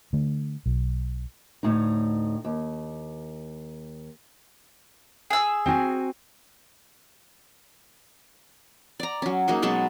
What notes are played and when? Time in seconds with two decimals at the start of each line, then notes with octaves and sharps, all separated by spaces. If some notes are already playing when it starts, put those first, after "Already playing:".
0.13 D3 A3
0.66 B1
1.63 D2 A2 D#4
2.45 D#2
5.30 G#4 E6
5.66 C4 F#4 G#5
9.00 D5 A#5
9.22 F#3 C#4
9.48 A#3 D#4 F#4 G#4
9.62 B2 F#3 G#3 A5